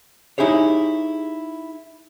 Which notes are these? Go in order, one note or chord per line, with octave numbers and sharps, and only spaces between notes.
D#4 E4 G4 G#4 C#5